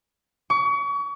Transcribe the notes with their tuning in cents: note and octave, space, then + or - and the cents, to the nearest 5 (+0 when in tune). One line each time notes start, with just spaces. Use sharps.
C#6 +35